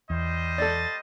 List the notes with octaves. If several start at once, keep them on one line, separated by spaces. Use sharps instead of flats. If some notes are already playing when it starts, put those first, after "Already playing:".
E2 G3 C5 D#5
A4 D5 A6